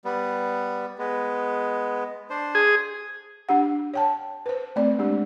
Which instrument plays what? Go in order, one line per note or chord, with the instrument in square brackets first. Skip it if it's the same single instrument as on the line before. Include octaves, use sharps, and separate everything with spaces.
[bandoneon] G3 B3
G#3 B3
D4 C5
[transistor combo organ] G#4
[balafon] D4 G4 F#5
C#5 G5 A5
B4 C5
A3 C4 D5
G#3 D4 G4